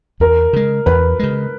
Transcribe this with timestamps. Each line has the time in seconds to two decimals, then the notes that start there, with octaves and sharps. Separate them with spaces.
0.20 E2 A#4
0.53 C#3 G#3
0.86 E2 B4
1.19 C#3 G#3